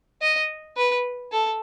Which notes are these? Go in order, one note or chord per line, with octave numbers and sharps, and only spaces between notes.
D#5
B4
A4